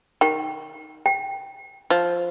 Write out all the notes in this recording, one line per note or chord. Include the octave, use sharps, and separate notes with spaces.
D#3 G5
G5
F3